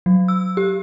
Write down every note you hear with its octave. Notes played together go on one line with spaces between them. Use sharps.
F#3
E6
G4